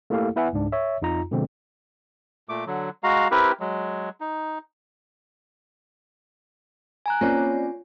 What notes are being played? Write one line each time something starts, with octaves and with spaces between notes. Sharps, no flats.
A3 A#3 E4 G4 A4 F5
B3 E4 B4 E5 F#5 G#5
C#2 G#2 D4
C#5 E5
F2 D#4 F4 A#5
B2 D3 F3 G#3 C4
A#2 A3 D6
D3 F#3
G#3 F#4 F5 A#5
C4 E4 G4 A#4 B4
F#3 G#3
D#4
G#5 A#5 F#6
A#3 C4 C#4 F4 C#5 D5 G#5